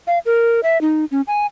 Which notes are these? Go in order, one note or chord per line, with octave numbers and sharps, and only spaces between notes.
F5
A#4
E5
D#4
C#4
G#5